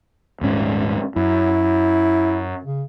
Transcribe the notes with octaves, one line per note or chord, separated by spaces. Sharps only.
D#1 G#2 C#4
F#2 E4
C#3